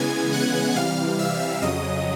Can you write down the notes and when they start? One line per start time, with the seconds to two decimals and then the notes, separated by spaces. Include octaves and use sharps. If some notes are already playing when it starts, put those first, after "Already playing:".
Already playing: C#3 E3 G#3 B3 G#5 G#6
0.33 F#5 F#6
0.76 C3 E3 G3 F5 F6
1.19 E5 E6
1.62 F2 C#3 F#3 D#5 D#6